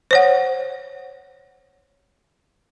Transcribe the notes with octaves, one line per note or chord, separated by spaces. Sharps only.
C5 C#5 F#5